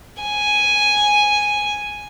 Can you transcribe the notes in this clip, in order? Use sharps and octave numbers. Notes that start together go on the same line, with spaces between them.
G#5